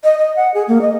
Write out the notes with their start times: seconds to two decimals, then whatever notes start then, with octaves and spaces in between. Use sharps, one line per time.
0.04 D#5
0.18 D#5
0.36 F#5
0.54 G#4
0.68 A#3
0.82 D#5